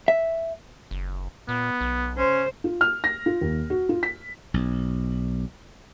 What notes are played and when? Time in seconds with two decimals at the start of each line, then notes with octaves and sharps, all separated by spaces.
0.08 E5
0.91 F#1
1.48 A#2 B3
1.81 B1
2.18 C#3 C#4 C5
2.64 F4
2.81 F6
3.04 A#6
3.26 F4
3.41 D#2
3.70 F#4
3.89 F4
4.03 B6
4.54 B1